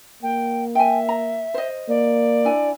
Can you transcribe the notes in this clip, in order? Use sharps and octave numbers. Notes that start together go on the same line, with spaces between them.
A#3 G5
E5 G5 G#5
A#5
C5 D#5
A#3 D5
D4 E4 G#5